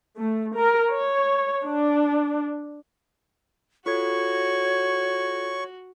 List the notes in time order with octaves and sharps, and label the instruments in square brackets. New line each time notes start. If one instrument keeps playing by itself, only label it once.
[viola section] A3
A#4
C#5
D4
[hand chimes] F4 A4 G#6 [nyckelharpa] F#4 [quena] C#5 [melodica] C#6